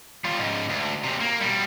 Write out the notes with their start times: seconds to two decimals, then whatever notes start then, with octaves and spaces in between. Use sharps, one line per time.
0.24 G3 F4
0.39 C#2 G#2
0.69 D2
1.04 D#2 C3
1.21 A#3
1.41 B2 G3